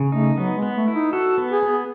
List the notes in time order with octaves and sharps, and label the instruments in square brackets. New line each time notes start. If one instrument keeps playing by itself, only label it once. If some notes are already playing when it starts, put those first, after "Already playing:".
Already playing: [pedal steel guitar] C#3
[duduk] A3 [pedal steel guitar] D#4
[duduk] F#3 [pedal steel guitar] B3
[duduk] G#3
[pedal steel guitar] B3
[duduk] A3
[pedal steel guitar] E4
[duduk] D#4
[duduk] F#4 [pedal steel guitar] A4
[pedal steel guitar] B3
[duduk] G#4
[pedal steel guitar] B3